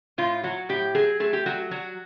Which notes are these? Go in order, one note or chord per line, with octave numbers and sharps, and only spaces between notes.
A2 F4
F#3 F#4
A2 G4
F#3 G#4
A3 G#4
G4
F#3 F#4
F#3 F#4